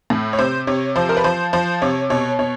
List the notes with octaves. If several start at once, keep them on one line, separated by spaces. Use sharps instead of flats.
A2
C#5
C3 C5
C3 C#5
F3 C5
A#4
B4
F3 C5
F3 C5
C3 C#5
B2 C#5
B2 C#5